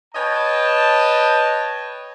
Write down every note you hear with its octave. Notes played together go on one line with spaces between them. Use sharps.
B4 C#5 D#5 G5 A5